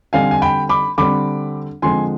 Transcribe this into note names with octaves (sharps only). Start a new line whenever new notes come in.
D3 G3 C4 F5 G#5
G#5
G5 B5
B5 D6
D3 G3 C4 B5 D6
D3 F3 G#3 C4 G#5 C6